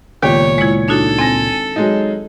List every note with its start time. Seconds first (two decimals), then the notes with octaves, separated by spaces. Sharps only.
0.23 C#2 A#2 D#3 B3 G4 C#5
0.58 G#3 E4 G#6 C#7
0.88 D4 D#4 F#4 A4
1.19 C4 G#5 A#6
1.76 F#3 G#3 D#4